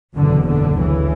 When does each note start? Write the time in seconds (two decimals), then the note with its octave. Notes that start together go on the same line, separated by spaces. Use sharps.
0.15 F#1 E2 B2 D3
0.46 D3
0.78 D2 C#3 E3